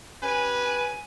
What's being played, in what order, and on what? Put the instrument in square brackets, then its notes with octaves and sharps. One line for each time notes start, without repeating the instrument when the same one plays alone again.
[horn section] C#4 G4 B4 [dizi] G#5